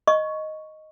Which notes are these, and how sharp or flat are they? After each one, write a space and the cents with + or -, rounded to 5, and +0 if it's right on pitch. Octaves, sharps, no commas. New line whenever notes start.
D#5 +0 C#6 +0